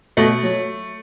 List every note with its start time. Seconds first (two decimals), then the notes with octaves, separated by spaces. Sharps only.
0.17 B2 A3
0.43 F#3